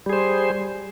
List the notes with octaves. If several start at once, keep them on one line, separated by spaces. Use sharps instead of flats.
G3 G#4 C5